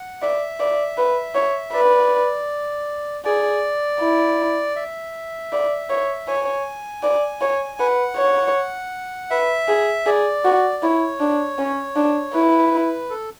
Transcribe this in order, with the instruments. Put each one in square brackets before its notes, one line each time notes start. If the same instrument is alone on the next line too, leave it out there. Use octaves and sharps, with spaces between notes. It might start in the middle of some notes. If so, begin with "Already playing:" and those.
Already playing: [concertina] F#5
[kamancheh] D5 [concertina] E5
[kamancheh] D5
B4
C#5
[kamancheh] B4 [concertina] D5
[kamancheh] G#4 [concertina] D5
[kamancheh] E4
[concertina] E5
[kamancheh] D5
C#5
[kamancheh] C#5 [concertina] G#5
[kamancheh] D5
C#5
[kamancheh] B4 [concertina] F#5
[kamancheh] C#5
[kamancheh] B4 [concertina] E5
[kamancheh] G#4
[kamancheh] G#4 [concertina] D5
[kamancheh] F#4
[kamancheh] E4 [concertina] C#5
[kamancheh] D4
C#4
D4
[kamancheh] E4 [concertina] B4
[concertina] A4